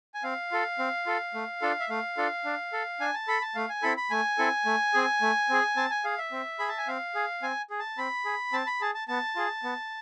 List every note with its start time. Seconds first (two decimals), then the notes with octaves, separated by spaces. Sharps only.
0.14 G#5
0.24 C4 F5
0.52 F4 A4
0.79 C4
1.06 F4 A4
1.34 A3
1.62 D4 F4 A4
1.80 E5
1.89 A3 F5
2.17 D4 F4 A4
2.45 D4
2.73 A4
3.00 D4 G#5
3.14 A5
3.28 A4 B5
3.42 A5
3.55 A3 F5
3.69 G#5
3.82 C4 E4 A4 B5
3.97 B5
4.10 A3 G#5
4.38 C4 E4 A4
4.65 A3
4.94 C4 G#4
5.21 A3
5.50 C4 G#4
5.76 C4 A5
5.90 G#5
6.05 G#4 F5
6.18 E5
6.32 C4
6.59 G#4 B5
6.69 A5
6.78 G#5
6.88 C4 F5
7.15 G#4
7.42 C4 G#5
7.70 G#4
7.80 A5
7.98 C4 B5
8.25 G#4
8.53 C4 A5
8.67 B5
8.81 G#4 A5
8.94 A5
9.08 B3 A5
9.36 F4 G#4
9.64 B3